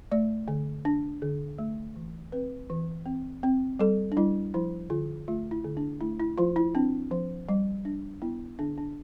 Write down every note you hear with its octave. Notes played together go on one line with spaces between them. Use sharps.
A3 D5
D3
D4
D3
A3
E3
C4 B4
E3
C4
C4
G3 A4
D4
G3 E4
F3 E4
D3 F4
A3 F4
E4
D3
D4
A3 E4
E4
F3 F4
E4
C4 D4
F3
G3
D4
B3 E4
D3 D4
D4